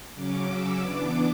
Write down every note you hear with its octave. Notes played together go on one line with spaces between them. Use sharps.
C#3 F#3 C#4 D6
E6
E3 B3 D4 D6